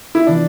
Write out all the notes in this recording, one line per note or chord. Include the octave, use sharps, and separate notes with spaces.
E4
C3 E3 B3 D4 F4